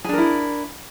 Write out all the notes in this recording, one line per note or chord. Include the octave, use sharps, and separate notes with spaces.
D4 E4 G#4 A#4